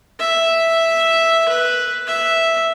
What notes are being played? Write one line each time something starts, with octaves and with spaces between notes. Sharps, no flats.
E5
B4
E5